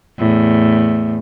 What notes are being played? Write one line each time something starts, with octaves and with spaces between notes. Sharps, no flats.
E2 A2